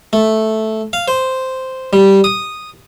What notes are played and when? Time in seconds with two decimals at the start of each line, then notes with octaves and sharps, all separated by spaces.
0.13 A3
0.93 F5
1.08 C5
1.93 G3
2.24 D#6